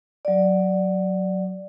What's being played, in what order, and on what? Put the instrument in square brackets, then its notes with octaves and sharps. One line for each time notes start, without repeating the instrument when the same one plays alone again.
[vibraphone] F#3 D5